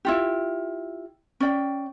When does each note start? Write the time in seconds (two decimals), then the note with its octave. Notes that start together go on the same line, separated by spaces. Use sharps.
0.05 E4 F4 G4
1.40 C#4 D5 G5